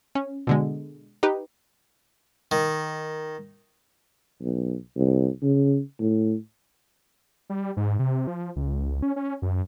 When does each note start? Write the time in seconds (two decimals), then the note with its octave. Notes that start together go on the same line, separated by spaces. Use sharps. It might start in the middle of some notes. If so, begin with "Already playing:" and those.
0.15 C#4
0.47 B2 D3 G#3
1.23 D#4 G4 B4
2.51 D#3
4.41 B1
4.96 C2
5.42 C#3
6.00 A2
7.50 G3
7.77 G#2
7.99 C3
8.27 F3
8.56 C#2
9.02 C#4
9.16 C#4
9.42 F#2